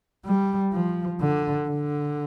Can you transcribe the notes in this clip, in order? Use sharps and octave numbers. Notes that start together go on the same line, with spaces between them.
G3
F3
D3
D3